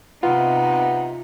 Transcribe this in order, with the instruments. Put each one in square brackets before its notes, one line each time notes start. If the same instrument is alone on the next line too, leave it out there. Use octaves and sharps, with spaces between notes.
[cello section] C3 D#4 [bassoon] B3 [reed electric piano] F4